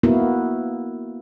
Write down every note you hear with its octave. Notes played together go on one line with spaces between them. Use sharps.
A#3 B3 E4 F#4 A#4